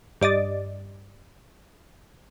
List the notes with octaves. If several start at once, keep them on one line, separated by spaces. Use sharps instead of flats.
G2 D5 D#5 A6